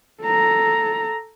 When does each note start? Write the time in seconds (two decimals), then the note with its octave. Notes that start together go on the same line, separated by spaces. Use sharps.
0.23 A4 A#5